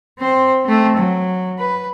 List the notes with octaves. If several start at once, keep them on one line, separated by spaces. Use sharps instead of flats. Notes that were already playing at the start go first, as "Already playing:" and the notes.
C4 C5
A3 C4
F#3
B4